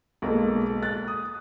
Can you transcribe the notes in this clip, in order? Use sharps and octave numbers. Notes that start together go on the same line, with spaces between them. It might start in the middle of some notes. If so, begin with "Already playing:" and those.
B1 G#3 A#3 A4
F#6 A6
D#6